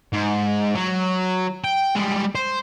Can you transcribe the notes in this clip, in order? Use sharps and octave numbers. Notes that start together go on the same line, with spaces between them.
G#2
F#3
G5
G3 G#3
C5